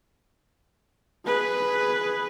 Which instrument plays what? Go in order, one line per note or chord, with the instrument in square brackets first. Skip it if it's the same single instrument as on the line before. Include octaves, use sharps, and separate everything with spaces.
[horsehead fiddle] G#4 B4